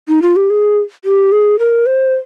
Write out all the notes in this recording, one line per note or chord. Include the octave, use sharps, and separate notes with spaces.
D#4
F4
G4
G#4
G4
G#4
A#4
C5